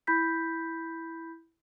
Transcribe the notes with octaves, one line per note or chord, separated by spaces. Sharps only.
E4 B5 G6 B6